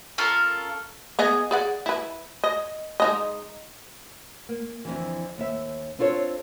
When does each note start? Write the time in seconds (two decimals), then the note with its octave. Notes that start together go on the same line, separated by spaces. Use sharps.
0.18 C#4 F4 A4 A#4
1.19 B3 G#4 D#5
1.51 G#4 D5 F#5
1.86 E4 B4
2.44 D#5
3.00 G#3 D#4 D#5
4.49 A#3
4.85 F2 B2 D3 E3
5.38 D#2 E5
5.99 C4 D4 F4 A4 C#5